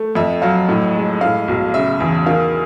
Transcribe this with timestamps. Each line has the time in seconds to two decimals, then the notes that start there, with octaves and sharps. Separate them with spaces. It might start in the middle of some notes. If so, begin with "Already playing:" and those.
Already playing: A3
0.15 F2 E5
0.42 F#3 F5
0.69 A2
0.96 G#3
1.21 A2 F5
1.48 B1
1.74 C#3 E5
2.00 E2
2.26 D#3 F5